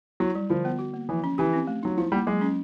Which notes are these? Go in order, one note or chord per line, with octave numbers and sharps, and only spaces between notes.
F#3 E4
G3
D3 F3
B3
F#4
A#3
E3 F3
C#4
E3 G4
C4
A3
F#3 D#4
F3 E4
G3 A#3
F#3 G#3
C#4